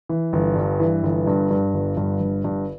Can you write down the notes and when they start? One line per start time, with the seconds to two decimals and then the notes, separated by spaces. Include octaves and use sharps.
0.09 E3
0.33 G1
0.56 G2
0.80 E3
1.04 G1
1.27 G2
1.51 G2
1.74 G1
1.97 G2
2.21 G1
2.44 G2